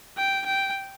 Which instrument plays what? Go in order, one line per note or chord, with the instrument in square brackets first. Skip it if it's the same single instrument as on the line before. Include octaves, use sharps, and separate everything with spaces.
[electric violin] G5
G5